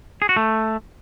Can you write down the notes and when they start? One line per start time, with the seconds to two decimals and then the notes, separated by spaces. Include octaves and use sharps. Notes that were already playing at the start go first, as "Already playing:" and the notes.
0.22 G#4
0.29 F#4
0.36 A3